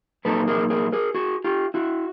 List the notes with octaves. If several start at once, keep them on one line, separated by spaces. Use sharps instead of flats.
A#2 F#3 A#3 D#4 A4 B4
G#4 A#4
G#4 A#4
G#4 A#4
F#4 G#4
F4 G4
E4 F#4